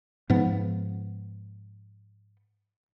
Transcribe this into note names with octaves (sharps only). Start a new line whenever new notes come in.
G#2 F3 B3